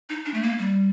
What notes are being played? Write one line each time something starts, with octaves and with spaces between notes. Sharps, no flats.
D#4
D4
A3
A#3
G3